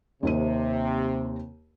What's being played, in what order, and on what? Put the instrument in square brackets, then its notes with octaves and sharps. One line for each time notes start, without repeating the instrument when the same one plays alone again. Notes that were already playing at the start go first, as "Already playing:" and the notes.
[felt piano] D#2 D#4 D#7 [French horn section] C3